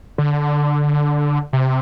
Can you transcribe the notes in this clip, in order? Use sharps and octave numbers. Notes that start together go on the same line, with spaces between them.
D3
C3